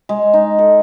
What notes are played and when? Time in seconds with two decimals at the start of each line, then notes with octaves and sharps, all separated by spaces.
0.09 G#3
0.34 D#4
0.59 A4